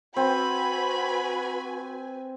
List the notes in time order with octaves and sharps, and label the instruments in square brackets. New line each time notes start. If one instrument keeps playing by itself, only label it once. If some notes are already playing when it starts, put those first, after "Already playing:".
[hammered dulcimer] C4 [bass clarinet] F#4 [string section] B4 G#5 [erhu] B5